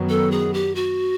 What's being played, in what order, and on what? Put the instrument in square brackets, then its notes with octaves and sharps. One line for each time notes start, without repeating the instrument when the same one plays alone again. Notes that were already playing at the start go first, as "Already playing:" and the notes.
Already playing: [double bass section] F#2 D#3 F#3 B3
[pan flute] A4
G#4
G4
F#4